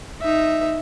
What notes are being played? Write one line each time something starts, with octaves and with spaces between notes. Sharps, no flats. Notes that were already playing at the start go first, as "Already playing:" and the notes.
D#4 E5